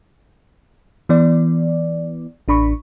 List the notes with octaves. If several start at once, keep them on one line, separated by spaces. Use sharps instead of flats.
E3 B3 D5
A1 D4 B5 C#6